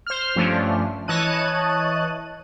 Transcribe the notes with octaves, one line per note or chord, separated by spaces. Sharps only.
C5 F6
G2 F3 A3 C#4 D4
E3 C#5 D#5 A5 F#6 D#7